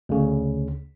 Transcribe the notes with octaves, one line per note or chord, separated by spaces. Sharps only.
D2 C#3